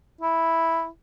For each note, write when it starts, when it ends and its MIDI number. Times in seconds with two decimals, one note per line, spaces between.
0.21 0.87 64